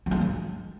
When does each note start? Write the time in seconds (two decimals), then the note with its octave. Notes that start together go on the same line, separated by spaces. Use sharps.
0.06 G3
0.11 G#3
0.16 A3
0.21 G#3